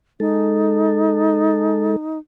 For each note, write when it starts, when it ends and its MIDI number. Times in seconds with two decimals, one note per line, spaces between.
0.20 1.96 56
0.20 2.18 63
0.20 1.96 69